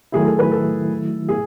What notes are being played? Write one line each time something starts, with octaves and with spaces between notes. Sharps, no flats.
D#3 F#3 A3 E4 G#4
A4
B4
A4
G#4